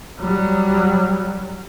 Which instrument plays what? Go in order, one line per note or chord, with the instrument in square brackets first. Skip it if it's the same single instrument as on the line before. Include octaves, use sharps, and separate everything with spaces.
[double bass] F#3 G3